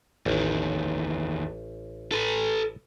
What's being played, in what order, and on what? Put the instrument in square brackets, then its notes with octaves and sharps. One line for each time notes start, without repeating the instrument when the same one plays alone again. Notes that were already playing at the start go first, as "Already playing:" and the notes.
[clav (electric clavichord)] A1 [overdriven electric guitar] E2 D#3
[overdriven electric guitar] A4 B4